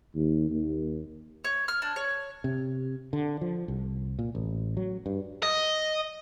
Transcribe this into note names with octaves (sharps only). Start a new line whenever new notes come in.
D#2
D#2
C#5
F6
D4
C#5
C3
D3
F3
C2
A#2
A1
F#3
G2
D#5